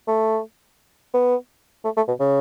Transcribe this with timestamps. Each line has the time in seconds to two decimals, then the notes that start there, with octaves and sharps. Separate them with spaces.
0.07 A3
1.14 B3
1.84 A3
1.97 A3
2.08 B2
2.20 C#3